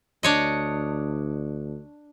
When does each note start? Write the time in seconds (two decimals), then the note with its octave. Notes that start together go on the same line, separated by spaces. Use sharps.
0.23 D2 D4 C#5 D#5